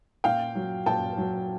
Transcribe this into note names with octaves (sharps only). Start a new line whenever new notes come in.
A#2 F5 G5
F#3
A#2 G5 A5
F#3